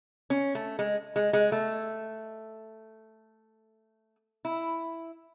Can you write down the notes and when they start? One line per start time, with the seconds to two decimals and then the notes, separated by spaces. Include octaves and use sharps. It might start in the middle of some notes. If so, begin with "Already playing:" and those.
0.30 C#4
0.55 A3
0.79 G#3
1.16 G#3
1.33 G#3
1.52 A3
4.45 E4